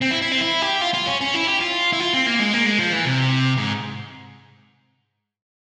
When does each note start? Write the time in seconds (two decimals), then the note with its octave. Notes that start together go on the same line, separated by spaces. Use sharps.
0.02 C4
0.11 E4
0.22 E4
0.32 C4
0.41 E4
0.62 G4
0.81 F4
0.94 F4
1.07 C#4
1.21 C#4
1.34 E4
1.47 G4
1.60 F4
1.93 E4
2.00 F4
2.13 C4
2.26 A#3
2.40 G#3
2.53 A#3
2.66 G#3
2.79 F3
2.92 E3
3.06 C3
3.58 G#2